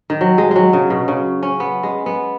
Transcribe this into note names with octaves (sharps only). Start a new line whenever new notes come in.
D#3
F#3
G#3
F#3 G#3
C#3
B2
C#3
C#4
B3
G#3
B3